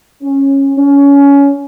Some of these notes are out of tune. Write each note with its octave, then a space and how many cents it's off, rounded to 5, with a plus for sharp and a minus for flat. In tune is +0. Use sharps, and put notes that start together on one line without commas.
C#4 -15
C#4 +20